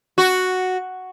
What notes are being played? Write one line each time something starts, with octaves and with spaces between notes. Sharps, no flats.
F#4